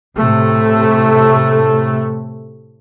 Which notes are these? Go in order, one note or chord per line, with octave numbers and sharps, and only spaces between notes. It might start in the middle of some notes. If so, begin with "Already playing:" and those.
A2 C3 A3